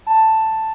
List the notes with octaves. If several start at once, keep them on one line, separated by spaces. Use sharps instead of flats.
A5